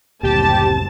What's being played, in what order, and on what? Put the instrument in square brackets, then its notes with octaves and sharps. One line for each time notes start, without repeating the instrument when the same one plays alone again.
[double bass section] F#1 G3 C4 [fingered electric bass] D2 A#2 [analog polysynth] G4 [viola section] A5